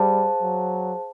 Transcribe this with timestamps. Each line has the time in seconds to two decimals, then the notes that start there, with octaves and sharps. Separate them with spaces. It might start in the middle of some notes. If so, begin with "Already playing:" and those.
Already playing: G3 G#4 C5 F5 A5
0.42 F#3